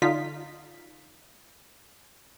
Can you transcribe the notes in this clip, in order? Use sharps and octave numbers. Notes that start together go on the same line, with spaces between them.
D3 D#4 F4 B6